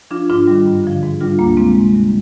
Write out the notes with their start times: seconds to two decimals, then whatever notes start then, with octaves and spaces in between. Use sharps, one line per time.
0.11 F3 D4 F4
0.30 G#2 D4 F4
0.47 D#3 G3
0.66 G2
0.84 D3 F3
1.03 G#2
1.21 G3 D4 F4
1.38 D2 A#3 D4
1.57 C3 F3 G#3 C4
1.75 G#2 G#3
1.93 D#3 G3